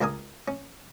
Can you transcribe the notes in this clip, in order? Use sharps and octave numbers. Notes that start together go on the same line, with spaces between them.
C#2 D4 A#4 G#5 D#6
C#4